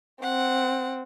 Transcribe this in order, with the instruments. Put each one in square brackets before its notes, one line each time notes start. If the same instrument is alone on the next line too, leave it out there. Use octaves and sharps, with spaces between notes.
[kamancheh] C4 [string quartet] F#5